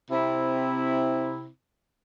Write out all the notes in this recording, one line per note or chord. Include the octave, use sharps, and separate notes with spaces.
C3 C4 E4